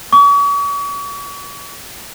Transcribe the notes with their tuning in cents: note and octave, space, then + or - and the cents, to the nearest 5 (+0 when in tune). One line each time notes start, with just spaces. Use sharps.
C#6 +45